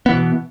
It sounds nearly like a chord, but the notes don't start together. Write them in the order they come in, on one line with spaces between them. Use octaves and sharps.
B3 E3 B2